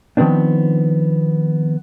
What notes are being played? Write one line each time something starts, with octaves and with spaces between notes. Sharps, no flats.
D#3 F3 B3 C4 D4